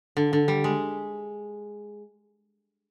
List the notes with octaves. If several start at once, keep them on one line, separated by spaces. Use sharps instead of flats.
D3
D3
G3
G#3